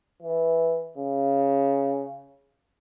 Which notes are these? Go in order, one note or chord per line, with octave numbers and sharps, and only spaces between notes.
E3
C#3